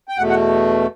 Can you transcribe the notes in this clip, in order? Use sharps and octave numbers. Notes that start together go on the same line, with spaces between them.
G5
E2 B2 A3 F#5
F#5